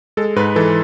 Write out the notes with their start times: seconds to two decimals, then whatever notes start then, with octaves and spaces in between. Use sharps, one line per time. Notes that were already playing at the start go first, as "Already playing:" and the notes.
0.17 G#3 A4
0.36 G#2 B4
0.56 E3 A4